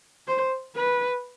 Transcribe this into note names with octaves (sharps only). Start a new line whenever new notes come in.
C5
B4